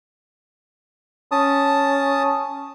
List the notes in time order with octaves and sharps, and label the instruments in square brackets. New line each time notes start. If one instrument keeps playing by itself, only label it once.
[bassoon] C#4 [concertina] A5 D#6